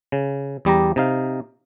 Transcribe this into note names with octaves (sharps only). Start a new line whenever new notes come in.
C#3
E2 G3 G4 A#5
C3 D#4 F5